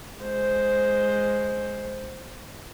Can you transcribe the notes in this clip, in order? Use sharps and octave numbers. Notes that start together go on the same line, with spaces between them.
G#3 C5